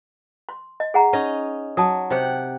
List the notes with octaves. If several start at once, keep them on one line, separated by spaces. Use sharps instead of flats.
C6
D#5
G#4 F#5 A#5
C#4 D#4 D#5
F#3 A5 D#6
C3 G4 F#5